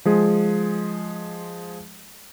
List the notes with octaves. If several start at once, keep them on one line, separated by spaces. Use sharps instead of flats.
F3 G#3 G#4